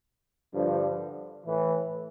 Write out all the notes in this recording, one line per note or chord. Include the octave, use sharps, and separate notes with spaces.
G2 D3 F3
A2 E3